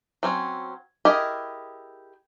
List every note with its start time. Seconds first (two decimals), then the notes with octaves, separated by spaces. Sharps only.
0.23 F#3 C4 C#4
1.05 E4 G4 G#4 A#4 D#5